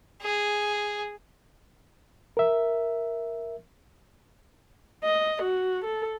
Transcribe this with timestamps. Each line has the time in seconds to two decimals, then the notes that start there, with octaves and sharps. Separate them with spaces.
0.22 G#4
2.37 A#4 E5
5.04 D#5
5.42 F#4
5.85 A4